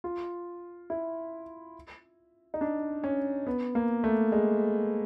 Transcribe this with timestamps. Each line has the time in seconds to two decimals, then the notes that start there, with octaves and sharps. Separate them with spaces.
0.04 F4
0.90 E4
2.54 D#4
2.61 D4
3.04 C#4
3.47 B3
3.75 A#3
4.04 A3
4.32 G#3